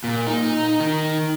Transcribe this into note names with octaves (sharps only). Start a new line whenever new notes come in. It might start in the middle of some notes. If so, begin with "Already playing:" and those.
A#2
D#4
D#3